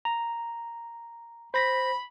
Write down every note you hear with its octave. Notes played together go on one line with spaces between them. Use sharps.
A#5
C5 B5 A#6 B6